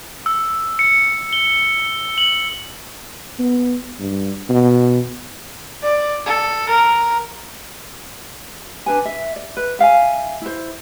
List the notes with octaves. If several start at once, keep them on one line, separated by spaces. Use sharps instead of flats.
E6
C#7
G7
F#7
B3
G2
B2
D5
A4
A#4
D4 B4 G#5
E5
D5
B4
E5 F5 G5 G#5
E4 C5